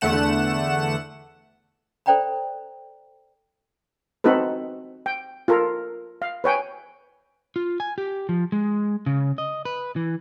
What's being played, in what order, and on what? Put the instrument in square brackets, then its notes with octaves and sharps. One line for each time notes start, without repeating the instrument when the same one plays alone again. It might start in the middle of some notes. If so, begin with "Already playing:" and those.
[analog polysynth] E2 D3 A3 F#5 E7
[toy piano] A4 C5 D5 G5 A#5 B5
[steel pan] C4 D#4 F#4 A4 B4
G5
F4 A4 A#4
F5
B4 C#5 G5 G#5
[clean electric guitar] F4
G#5
G4
F3
G#3
C#3
D#5
B4
E3